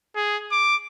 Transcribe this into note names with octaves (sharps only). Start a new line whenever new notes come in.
G#4
D6